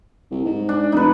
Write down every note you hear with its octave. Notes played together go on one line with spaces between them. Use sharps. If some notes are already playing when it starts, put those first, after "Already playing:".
C2
G#2
D4
F1 D#4 B4